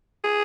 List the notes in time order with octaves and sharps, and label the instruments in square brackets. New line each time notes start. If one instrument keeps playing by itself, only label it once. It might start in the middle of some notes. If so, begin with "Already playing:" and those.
[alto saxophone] G#4